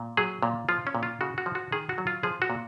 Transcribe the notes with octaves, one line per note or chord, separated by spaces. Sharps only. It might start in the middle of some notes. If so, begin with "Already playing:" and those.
Already playing: A#2
F#3 G#4
A#2
F3 F4
C#4
A#2
F4
C#3 F#4
F#4
F3
F#4
D#3 G#4
F#4
F#3
F4
F3 G#4
F#4
A#2